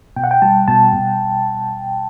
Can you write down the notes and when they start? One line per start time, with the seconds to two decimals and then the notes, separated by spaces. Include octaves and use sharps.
0.16 B2 G5
0.24 F#5
0.31 G5
0.42 G3 A5
0.68 B2 A5
0.93 B2